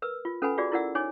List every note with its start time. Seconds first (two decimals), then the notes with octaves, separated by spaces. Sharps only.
0.02 A#4 B4 E6
0.25 F4
0.42 C#4 A4 B4 F#5 G#5 B5
0.58 F4 F#4 G#4 D5
0.72 E4 F4 A#4 D5 F#5 E6
0.95 D#4 C#5 G#5 D6